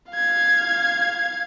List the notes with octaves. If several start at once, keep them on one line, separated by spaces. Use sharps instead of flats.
F5 G#6